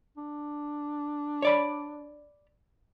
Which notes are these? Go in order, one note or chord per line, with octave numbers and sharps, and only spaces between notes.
D4
C#5 D5 B5